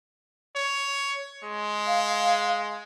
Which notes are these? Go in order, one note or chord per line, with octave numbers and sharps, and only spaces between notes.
C#5
G#3
F5